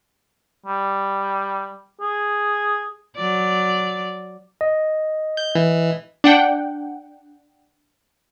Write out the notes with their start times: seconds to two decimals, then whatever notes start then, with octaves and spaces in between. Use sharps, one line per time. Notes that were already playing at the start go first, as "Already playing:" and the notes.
0.66 G3
2.01 G#4
3.16 F#3 D5
4.61 D#5
5.37 G6
5.55 E3
6.24 D4 F#5 G5